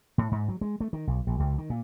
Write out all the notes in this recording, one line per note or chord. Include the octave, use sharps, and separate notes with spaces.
A2
G#2
F#3
G#3
A3
D#3
B1
A#1
C#2
D#3
A#2